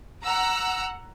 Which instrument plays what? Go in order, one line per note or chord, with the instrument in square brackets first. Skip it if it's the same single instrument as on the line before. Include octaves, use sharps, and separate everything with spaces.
[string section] F#5 A#5 E6